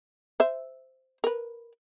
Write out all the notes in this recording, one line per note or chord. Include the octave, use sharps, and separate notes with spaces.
C5 E5
A#4 B4